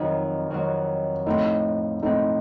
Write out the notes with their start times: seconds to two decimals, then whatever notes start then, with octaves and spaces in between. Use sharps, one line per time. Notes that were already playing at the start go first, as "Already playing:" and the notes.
Already playing: F2 D#3 F#3 D#4
0.51 F2 D#3 F#3
1.26 A2 F3 C4 D#4
2.02 A2 F3 C4 D#4